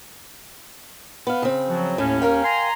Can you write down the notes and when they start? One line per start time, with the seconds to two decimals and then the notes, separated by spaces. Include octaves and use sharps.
1.27 B3 F5
1.42 C#3 C4
1.69 F3 F#3 F#4
1.98 D#2 A2 C#4
2.22 A#4 F5 G5
2.44 G#5 A#5 C6